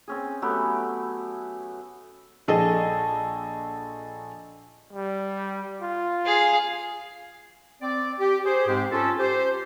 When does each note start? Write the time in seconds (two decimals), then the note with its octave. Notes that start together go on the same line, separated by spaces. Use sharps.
0.08 C4 C#4 G#4
0.42 F#3 A3 B3 G4
2.48 A#1 G#4 A4 D#5
4.93 G3
5.82 F4
6.25 G#4 F5
7.82 C4 D5
8.20 G4
8.45 G#4 C5
8.68 G#2 G#3 C4 G4
8.92 C#4 F4 A4
9.19 G4 C5